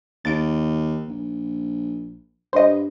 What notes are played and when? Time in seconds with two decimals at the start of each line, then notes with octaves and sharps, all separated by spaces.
0.25 D#2 A6 D7
1.08 A#1
2.53 G2 C5 D#5